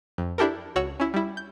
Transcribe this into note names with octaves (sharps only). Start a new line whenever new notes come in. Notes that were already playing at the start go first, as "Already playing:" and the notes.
F2
D4 E4 G4 A4 A#4
C#2 F#4 C#5 F#5 E6
C#4 E4
G3 E4
G6